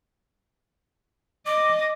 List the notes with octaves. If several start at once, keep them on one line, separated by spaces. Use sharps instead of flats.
D#5 D6